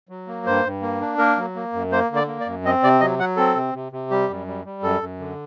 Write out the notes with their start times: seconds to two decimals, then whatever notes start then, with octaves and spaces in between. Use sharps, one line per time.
0.09 F#3
0.27 A#3
0.46 G2 C5
0.65 G2
0.82 A#3
1.01 D4
1.18 A#3 A#4
1.37 F#3
1.56 A#3
1.73 F#2
1.92 A#3 C5
2.10 D3
2.16 D5
2.28 A#3
2.40 D5
2.46 F#2
2.65 C4 D#5
2.83 C3 D5
3.00 F#3 D#5
3.19 F#3 F#5
3.37 C4 A4
3.55 C3
3.74 C3
3.92 C3
4.10 G3 G4
4.29 F#2
4.47 G3
4.65 G3
4.83 F#2 A4
5.01 F#2
5.19 D3